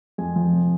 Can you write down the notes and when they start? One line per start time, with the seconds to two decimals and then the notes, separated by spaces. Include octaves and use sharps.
0.18 F2 G#5
0.36 F3
0.53 C3